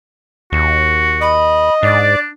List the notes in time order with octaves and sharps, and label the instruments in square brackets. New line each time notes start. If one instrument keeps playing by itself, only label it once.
[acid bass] D#2 [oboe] F#4
[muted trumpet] D#5 [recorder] B5
[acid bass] G#2 [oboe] D4 [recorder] D5